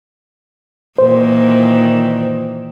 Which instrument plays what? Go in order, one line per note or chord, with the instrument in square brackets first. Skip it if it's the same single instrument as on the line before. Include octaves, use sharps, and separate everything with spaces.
[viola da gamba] A#2 D#3 E3 [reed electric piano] C5